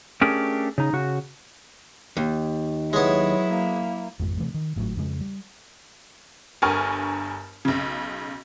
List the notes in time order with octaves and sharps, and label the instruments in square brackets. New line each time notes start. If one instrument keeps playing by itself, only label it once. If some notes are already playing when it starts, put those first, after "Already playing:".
[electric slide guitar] A3 C#4 D4 G4 G#4 A#4
C#3 D#4
C#3 F#4
[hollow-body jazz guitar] D#2
[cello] F#3 E4 [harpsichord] G#3 B3 [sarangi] C#5
[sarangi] A#3
[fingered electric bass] G#1 F2 G#3
C3 E3 G#3 A3
D#3
G#1 A2 C#3 F#3
F2 C#3 E3 G#3
G3
[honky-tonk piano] G1 G2 A#4 G#5 C#6 F6
B1 C#3